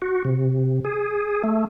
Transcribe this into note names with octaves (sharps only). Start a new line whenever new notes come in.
F#4
C3
G#4
A3